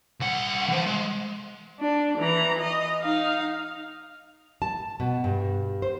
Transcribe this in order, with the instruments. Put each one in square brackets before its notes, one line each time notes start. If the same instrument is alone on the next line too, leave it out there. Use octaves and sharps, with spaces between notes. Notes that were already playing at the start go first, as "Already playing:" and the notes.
[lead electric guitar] C2 F#5
E3 C5
G#3
[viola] D4
E3 A#5
D#5
D#4 F5
[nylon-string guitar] A5
B2
G2
C5